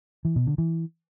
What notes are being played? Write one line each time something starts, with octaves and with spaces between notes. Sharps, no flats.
E3
B2
D3
E3